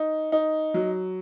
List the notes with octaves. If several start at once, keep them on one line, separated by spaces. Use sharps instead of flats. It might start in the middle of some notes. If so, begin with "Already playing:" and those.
Already playing: D#4
D#4
F#3